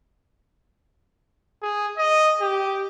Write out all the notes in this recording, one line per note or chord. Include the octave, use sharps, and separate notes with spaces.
G#4
D#5
G4